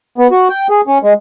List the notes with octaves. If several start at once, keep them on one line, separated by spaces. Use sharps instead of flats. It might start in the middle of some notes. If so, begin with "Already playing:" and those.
B3
F#4
G5
G#4
C#4
G#3